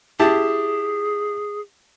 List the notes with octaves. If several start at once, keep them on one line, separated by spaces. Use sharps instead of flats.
E4 G4 G#4 A5